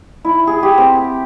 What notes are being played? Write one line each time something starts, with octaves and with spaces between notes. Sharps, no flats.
E4
G#4
G4
C4